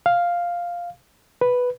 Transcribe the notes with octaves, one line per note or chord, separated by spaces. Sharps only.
F5
B4